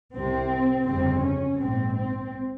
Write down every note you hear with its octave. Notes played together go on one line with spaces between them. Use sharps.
C2 C3 C4
G1 F2 C#3 C4
C#4
A#1 G#2 C4
C4